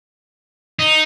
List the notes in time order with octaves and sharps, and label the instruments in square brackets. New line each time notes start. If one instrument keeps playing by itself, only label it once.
[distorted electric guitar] D#4